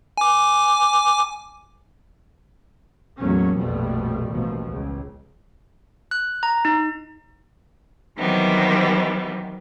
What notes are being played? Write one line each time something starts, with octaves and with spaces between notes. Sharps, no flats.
G#5 D6
A1 E2 F#3 A3 A#3 C#4
A#1 F2 B2 F3 G3 A3
A1 D#2 B2 F3
C#2
F#6
A#5
D#4
D#3 E3 F#3 G3 B3 C4